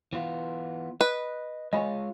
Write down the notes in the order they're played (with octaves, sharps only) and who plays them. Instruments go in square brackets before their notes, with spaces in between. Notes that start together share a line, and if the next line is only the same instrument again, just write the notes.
[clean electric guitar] E3 B3 F4
[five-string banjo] B4 [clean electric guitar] D#5
[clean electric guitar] G#3 F4 C#5 [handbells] D#5 G#5 B5